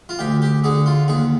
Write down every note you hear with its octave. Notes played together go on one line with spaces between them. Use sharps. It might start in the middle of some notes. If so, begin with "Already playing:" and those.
F4
D2 G4
G4
D3 G#4
F4
D#2 G#4